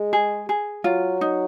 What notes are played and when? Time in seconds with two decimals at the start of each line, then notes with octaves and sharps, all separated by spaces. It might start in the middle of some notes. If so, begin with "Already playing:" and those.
Already playing: G#3
0.13 G#4
0.49 G#4
0.84 F#3 F4
1.21 D#4